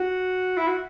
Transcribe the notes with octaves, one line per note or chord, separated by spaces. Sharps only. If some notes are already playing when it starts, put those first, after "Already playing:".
Already playing: F#4
E4
F#4